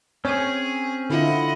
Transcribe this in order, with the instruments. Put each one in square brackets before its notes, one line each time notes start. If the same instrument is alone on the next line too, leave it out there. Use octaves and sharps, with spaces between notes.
[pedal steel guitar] C4 C#4 [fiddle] G#4 [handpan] C#5
[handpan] D3 E4 F4 [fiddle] D#5 F#5